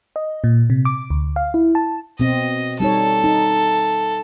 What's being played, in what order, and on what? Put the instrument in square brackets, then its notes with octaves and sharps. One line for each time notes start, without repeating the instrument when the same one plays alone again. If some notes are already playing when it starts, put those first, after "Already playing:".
[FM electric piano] D#5
A#2
C3
D6
D2
F5
E4
A5
[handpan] B2 C4 [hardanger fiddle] D#5
[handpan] G3 D#4 C#5 [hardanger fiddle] A4
[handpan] D#4